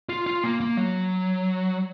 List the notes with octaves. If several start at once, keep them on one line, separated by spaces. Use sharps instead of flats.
F4
F4
A#3
A#3
F#3